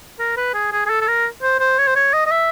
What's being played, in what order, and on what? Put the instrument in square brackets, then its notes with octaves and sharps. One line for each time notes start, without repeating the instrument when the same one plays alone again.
[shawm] A#4
B4
G#4
G#4
G#4
A4
A4
A#4
C5
C5
C#5
C5
C#5
D#5
D#5
E5